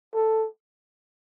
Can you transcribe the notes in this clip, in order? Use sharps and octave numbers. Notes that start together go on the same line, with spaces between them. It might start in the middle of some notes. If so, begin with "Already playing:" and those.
A4